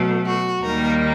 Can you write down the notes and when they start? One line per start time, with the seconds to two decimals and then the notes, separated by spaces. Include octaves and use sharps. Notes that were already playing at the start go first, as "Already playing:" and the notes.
Already playing: B2 F#3 A3
0.26 F#4
0.62 D#2 D#3 G3 A#3 D#4 A#4